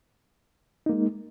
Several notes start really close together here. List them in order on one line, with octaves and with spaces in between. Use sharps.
D#4 A#3 G#3